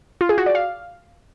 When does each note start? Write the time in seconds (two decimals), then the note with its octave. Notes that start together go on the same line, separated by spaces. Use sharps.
0.21 F4
0.29 G#4
0.38 F#4
0.46 D5
0.55 F5